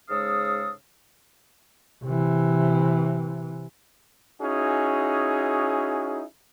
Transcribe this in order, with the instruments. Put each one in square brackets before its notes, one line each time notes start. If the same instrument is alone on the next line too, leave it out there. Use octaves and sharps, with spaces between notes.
[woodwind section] G#2 C#3 G#3 A4 F5 D#6
[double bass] C3 E3
[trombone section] C#4 D#4 E4 F#4 G#4